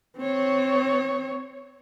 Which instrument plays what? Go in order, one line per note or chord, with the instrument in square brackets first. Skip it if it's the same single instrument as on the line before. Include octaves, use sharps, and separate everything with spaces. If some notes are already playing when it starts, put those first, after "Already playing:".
[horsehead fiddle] C4 C#5